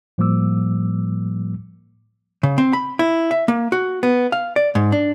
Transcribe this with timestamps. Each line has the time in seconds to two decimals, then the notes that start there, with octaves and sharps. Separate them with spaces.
0.18 A2 F3 G3 A#3 D6 E6
2.43 C#3
2.58 C4
2.73 B5
2.99 E4
3.31 E5
3.48 A#3
3.72 F#4
4.03 B3
4.32 F5
4.56 D5
4.75 G#2
4.92 D4